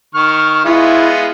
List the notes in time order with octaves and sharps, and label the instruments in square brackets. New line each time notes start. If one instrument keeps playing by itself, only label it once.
[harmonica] D#3 C#6 F6
[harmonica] G#3 B3 F4 [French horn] E4